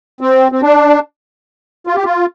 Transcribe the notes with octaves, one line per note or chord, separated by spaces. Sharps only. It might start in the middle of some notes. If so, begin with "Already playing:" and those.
C4
C4
D4
F4
G4
F4